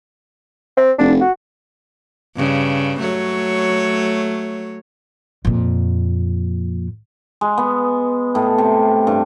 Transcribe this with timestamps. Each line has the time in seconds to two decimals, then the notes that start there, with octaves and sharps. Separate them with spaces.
0.77 C4
0.99 F1 D4
1.21 F#4
2.36 G2 C#3
3.00 F#3 A3 C#5
5.45 F2 A#2
7.41 G#3
7.58 B3
8.35 A2
8.58 C3
9.07 G2